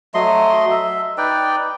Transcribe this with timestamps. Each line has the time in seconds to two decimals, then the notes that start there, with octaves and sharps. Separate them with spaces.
0.14 F#3 A3 D#5 C6
0.70 E5
1.18 D#4 B4 D5 G5